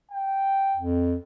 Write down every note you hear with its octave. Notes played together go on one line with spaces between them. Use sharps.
G5
F2